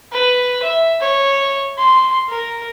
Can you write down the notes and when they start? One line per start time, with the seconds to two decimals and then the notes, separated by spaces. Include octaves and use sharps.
0.12 B4
0.63 E5
1.01 C#5
1.78 C6
2.29 A#4